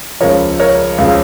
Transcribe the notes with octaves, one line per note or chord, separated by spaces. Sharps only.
C#2 C#3 F3 A#4 C#5
A#4 C#5
C#2 C#3 F3